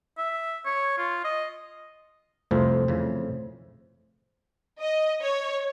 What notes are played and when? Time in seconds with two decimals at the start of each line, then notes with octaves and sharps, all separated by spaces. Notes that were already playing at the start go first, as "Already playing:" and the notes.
0.18 E5
0.65 C#5
0.98 F4
1.25 D#5
2.51 C2 F2 F3 A3 C5
2.88 F2 C#3 E3
4.80 D#5
5.22 C#5